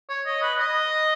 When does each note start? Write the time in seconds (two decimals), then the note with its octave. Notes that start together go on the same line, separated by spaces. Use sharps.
0.09 C#5
0.26 D#5
0.42 B4
0.59 D#5